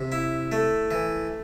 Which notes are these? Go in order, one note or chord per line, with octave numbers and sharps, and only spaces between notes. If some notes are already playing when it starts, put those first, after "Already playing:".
Already playing: C3
E4
A3
E3